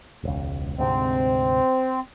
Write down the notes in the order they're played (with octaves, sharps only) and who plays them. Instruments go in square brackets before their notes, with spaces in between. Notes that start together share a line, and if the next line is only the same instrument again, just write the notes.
[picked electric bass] E1 C#2
[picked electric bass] D2 G#2 C3 [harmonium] C4